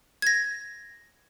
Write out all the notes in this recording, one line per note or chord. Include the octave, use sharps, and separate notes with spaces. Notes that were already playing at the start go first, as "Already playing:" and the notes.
G#6 A#6